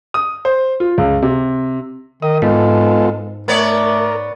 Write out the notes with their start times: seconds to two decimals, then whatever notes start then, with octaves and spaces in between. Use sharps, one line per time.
0.14 D#6
0.45 C5
0.80 F4
0.98 C#2
1.22 C3
2.22 D#3 D#5
2.42 G#2 G#3 B3 F4 A4
3.48 A3 B3 A#4 C#5 D5